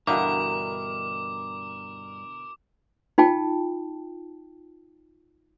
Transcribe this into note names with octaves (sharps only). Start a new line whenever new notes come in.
G2 B2 D3 E3 A#4 D6
D#4 F4 G5 A5